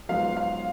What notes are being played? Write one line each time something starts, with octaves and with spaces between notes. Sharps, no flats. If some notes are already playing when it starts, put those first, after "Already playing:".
G#2 F#3 B3 F4 F5
F5